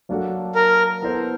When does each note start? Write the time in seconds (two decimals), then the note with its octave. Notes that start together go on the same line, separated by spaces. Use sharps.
0.09 F#3 A#3 D4 F#4 A4
0.55 A#4
1.02 B3 E4 A4 C5